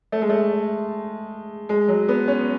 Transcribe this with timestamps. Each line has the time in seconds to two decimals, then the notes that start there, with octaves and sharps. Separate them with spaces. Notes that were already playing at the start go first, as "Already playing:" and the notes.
0.12 A3
0.22 G#3
0.29 A3
1.69 G#3
1.88 F#3
2.08 B3
2.28 C#4